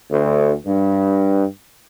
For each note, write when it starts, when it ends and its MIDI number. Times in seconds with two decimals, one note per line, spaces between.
0.11 0.52 38
0.66 1.45 43